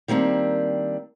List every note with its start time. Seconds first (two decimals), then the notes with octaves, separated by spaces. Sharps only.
0.08 D#3 G3 A#3 C4 D4